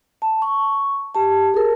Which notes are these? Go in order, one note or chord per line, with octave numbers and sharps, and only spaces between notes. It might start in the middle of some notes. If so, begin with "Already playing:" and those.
A5
C#6
G4 A5
G#4 A#4